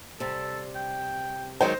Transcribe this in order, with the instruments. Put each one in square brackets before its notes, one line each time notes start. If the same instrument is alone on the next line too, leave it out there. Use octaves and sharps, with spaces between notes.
[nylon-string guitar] C3 G3 [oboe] A4
[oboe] G5
[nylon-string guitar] D#3 F#3 G#3 [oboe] D#4 [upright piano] C5